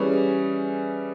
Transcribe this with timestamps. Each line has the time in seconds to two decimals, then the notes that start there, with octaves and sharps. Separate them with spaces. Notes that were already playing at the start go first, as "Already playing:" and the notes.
Already playing: E3 G3 C#4 G#4